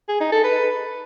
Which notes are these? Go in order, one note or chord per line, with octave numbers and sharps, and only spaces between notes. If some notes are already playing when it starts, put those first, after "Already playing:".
G#4
D#4
A4
B4